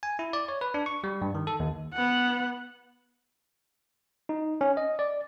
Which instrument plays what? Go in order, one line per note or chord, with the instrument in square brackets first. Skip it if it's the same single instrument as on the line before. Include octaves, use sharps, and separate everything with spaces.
[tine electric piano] G#5
E4
D5
C#5
B4
D4
C#6
G3
G2
D#3
A4
D#2
[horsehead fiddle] B3 F#5
[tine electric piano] D#4
C#4
D#5
D5